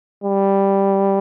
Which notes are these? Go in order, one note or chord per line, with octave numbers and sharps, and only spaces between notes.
G3